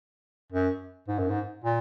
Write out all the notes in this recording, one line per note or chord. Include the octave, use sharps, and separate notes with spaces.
F#2
G#2
F#2
G#2
A#2